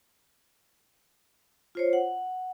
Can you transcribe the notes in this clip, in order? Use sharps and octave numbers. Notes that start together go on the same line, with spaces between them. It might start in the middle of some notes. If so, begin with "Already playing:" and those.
F4 C5 C#5
F#5